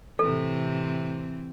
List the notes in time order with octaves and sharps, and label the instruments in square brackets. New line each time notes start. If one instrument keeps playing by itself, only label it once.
[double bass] A2 C3 [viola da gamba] E3 C4 [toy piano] A4